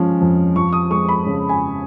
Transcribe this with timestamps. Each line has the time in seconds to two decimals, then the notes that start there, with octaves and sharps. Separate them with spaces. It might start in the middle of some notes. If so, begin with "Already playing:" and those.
Already playing: F3 G#3 C#4
0.21 F2
0.56 F3 C#6
0.73 D#6
0.90 G#3 C#6
1.09 B5
1.26 C#3
1.49 G#5